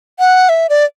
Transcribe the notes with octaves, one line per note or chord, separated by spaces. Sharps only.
F#5
E5
D5